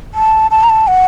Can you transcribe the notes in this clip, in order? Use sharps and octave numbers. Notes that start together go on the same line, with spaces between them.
A5
A5
A#5
A5
F#5